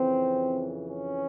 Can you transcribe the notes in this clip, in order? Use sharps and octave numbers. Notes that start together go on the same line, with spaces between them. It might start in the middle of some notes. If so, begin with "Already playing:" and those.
Already playing: F2 C#3 E3 C4
C#4